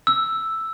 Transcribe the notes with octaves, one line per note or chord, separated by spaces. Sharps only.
E6